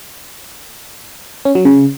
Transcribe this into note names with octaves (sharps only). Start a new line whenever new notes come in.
C#4
F#3
C#3